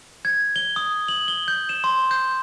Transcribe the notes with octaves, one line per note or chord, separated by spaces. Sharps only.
G#6
G7
D#6
F#7
G7
G6
E7
C6
G6